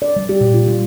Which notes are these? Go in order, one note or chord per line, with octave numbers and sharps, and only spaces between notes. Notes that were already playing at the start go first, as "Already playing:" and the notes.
D5
G3
G4
A#2
F4
G3